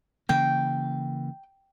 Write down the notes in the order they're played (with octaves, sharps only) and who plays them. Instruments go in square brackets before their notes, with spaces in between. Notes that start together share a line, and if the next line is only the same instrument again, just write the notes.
[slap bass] C#3 E3 A#3 [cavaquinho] G5